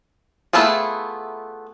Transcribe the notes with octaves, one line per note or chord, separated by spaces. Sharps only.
A3 B3 E4 F4 G#4